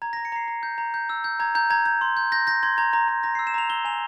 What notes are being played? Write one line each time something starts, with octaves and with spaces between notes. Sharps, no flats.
A#5 G#6
A#5 A#6
C#7
A#5 C7
A#5
G6
A#5
G6
E6
G6
A#5 G#6
A#5 G6
A#5 G#6
G6
C6
G6
G6 A#6
G6 A#6
C6 G#6
A#5 G#6
A#5
A#5
A#5 A#6
E6 C7
E7
A#5 F7
E6 G7
G#5 F7